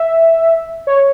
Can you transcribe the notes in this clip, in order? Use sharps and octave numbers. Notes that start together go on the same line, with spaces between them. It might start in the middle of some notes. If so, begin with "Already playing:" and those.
Already playing: E5
C#5